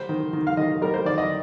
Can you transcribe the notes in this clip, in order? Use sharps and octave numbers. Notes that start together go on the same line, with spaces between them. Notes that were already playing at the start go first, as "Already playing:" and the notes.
Already playing: G3 C5
D#3
D#3
F5
D#3 D#5
G3 A#4
C5
D#3 D5
D#5